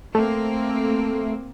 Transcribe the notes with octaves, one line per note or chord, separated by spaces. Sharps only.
A3 A#3 C4